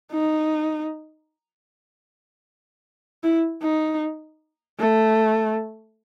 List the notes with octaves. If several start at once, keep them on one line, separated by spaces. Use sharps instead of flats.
D#4
E4
D#4
A3